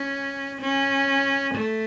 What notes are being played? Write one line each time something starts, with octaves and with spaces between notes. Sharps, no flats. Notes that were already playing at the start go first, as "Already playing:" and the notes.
Already playing: C#4
C#4
A3